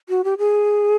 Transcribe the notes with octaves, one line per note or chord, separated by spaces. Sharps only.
F#4
G4
G#4